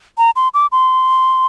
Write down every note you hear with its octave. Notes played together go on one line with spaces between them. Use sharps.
A#5
C6
D6
C6